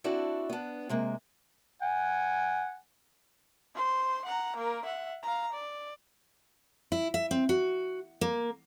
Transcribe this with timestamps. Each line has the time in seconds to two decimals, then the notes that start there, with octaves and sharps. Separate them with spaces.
0.04 C4 D4 E4 F#4 A4 D5
0.49 B3 D4
0.89 C3 G#3 A#3
1.82 F#5 G#5
3.75 C5 C6
4.26 F#5 A#5
4.56 A#3 A#4
4.85 E5 F#5
5.23 F5 A#5
5.53 D5
6.92 E4
7.14 E5
7.31 C4
7.49 F#4
8.21 A#3